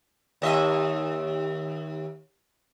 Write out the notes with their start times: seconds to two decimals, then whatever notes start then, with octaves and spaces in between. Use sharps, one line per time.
0.42 D#2 D#5 E5